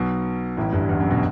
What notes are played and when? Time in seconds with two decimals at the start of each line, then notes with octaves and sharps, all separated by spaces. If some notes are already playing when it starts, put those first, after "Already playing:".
Already playing: B1 B2
0.57 A1 A2
0.73 G1 G2
0.89 E2
1.00 F#2
1.10 B2